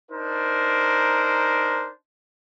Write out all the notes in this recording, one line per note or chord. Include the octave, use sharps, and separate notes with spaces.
D4 D#4 A#4 C5